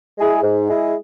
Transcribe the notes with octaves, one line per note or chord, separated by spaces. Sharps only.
G#3 E4 G#4
G#2
G#3 E4 G#4